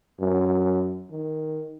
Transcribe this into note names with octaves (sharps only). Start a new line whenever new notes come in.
F#2
D#3